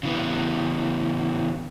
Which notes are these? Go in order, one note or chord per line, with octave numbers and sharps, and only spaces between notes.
C#3 E3 B3